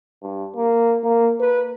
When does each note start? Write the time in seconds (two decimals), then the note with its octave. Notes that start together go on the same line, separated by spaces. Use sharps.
0.22 G2
0.55 A#3
1.04 A#3
1.40 B4